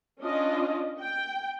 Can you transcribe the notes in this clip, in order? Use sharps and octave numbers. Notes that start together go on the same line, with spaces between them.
C#4 D4 F4 D#5
G5